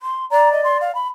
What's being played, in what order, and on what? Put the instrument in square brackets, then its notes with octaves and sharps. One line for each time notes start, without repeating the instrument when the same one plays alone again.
[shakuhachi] C6
[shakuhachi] D5 [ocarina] A#5
[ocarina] D#5
C6
F5
B5